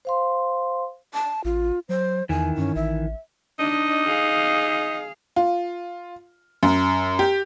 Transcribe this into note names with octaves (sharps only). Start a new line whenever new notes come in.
C5 F5 C6
A5
A1 F4
F#3 C5
E2 D#3 E3 G#5
G2 C#4
A1 E5
D4 D#4 D#5
G#4 F5
F4
F#2
G4